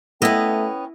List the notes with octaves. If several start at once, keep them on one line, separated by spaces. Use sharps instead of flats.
A3 B3 C#4 E4 D#5 G5